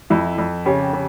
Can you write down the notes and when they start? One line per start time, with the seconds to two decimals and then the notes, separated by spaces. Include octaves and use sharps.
0.10 F2 E4
0.38 F2
0.66 C#3 G4
0.93 C#3